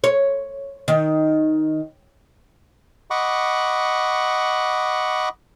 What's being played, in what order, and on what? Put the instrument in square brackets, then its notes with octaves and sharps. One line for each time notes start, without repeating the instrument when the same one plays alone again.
[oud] C#5
D#3
[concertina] D#5 F#5 B5 C#6 D6